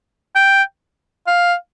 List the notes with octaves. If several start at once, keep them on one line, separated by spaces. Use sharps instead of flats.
G5
F5